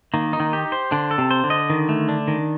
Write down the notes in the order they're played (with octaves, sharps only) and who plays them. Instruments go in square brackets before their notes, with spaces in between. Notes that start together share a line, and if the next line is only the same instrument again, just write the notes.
[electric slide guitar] D#3 [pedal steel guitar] A#3
[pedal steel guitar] D#4
[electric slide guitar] D#3
[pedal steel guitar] G4
C5
[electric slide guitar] D3 [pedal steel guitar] D4
[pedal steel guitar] A4
[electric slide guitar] C3
[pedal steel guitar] C5
[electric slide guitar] D3
[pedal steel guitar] D#5
D#3
A3
D4
D#3